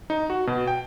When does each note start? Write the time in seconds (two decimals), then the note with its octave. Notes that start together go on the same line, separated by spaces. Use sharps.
0.10 D#4
0.30 F#4
0.47 B2
0.67 G5